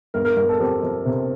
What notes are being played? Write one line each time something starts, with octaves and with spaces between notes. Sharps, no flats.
G1 A#4
A#4
G1 A#4
A4
F2 G4
F2
C3